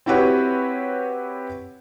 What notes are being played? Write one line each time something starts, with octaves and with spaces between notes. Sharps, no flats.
C4 E4 F#4 G4 B4 C#5